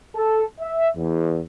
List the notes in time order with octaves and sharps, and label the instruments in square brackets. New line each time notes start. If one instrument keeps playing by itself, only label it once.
[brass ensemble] A4
E5
E2